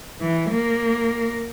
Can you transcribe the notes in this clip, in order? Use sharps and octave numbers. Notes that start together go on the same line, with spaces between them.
E3
A#3